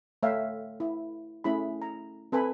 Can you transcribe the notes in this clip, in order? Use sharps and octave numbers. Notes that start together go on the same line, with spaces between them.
A3 C#5 E5 F5 G5
E4
A3 C#4 E4 G#4 B5
A#5
C4 A4 B4 G#5 B5